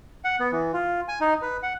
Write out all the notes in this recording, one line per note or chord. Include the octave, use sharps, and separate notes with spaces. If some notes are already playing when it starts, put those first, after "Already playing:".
F#5
B3
E3
F4
G#5
D#4
B4
F#5